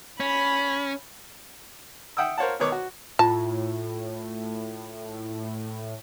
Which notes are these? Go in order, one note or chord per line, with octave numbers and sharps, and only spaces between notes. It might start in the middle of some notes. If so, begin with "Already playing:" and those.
C#4 B5
E5 F#5 G5 D#6 E6
A#4 C5 C#5 F5 F#5 A5
B2 D#3 B4 C#5 D6
F#4
A2 F4 A5